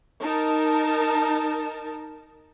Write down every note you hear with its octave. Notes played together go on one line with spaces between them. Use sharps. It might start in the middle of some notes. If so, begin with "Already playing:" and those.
D#4 A#4 A5